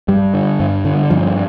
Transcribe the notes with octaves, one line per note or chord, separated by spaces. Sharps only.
G2 G3
D3
G2
D3
G2 F3